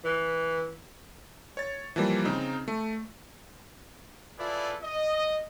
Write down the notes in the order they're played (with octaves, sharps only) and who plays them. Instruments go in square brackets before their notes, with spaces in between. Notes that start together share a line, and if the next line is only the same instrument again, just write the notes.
[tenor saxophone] E3
[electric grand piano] C#5 A6
E3 F3 G3 A#3
C#3 C4 D#4
A3
[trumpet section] E4 F4 G#4 A4 B4 D5
D#5